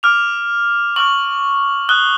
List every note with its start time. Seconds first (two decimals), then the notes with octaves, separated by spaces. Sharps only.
0.03 D6 F6 F7
0.96 C#6 F6 F#7
1.89 D#6 F#6 G7